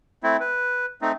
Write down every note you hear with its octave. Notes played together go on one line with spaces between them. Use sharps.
A3 C4 E4
B4
A3 C4 D#4